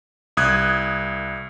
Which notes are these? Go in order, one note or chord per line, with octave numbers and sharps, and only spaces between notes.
C2 D#6 F#6 G#6